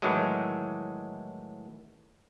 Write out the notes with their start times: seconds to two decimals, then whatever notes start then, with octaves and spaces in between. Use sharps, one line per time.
0.02 A2 D#3 E3 F#3 G#3